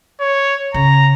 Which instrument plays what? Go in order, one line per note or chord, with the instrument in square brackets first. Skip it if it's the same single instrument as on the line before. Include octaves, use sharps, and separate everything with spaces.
[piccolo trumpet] C#5
[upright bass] C#3 [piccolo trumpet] A#5